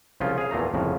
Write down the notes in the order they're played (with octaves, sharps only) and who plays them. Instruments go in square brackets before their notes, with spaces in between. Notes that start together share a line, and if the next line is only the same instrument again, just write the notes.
[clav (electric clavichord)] C2 C#3 F3 C#4 F4
G#4 F5
E2 A#2 A3 A#5
C2 F2 A2 C#3